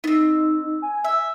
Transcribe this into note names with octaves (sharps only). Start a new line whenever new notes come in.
B3 C4 D#4
G#5
E5